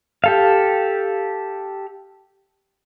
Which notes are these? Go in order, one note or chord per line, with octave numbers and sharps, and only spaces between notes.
G4 A4 F5